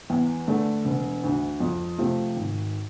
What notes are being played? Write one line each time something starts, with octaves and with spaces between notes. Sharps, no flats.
E2
D3 A3 D4 A4
E1
D2 D3
F2
C3 F3 A3 C4
G#1